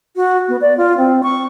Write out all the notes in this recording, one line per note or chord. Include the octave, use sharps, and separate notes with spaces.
F#4
B3
D5
F4
C4
C#6